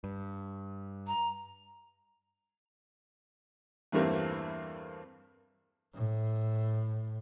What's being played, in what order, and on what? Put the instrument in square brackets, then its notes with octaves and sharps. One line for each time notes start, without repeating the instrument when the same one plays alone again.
[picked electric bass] G2
[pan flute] A#5
[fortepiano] E2 G2 E3 A3 A#3 C4
[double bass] A2